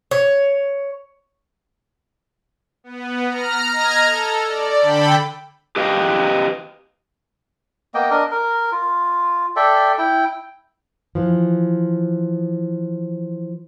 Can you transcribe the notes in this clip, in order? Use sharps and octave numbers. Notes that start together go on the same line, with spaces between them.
C#5
B3
A#5 F6
D#5 A#5 F6 G#6
A4
D5
D3 A4 G5 B5
G4 B4 D#5 F5 G5
A#3 B3 D#5 G5
D4 A#4 D#5
A#4
F4
A4 D5 E5 G5
E4 G5
E3 F3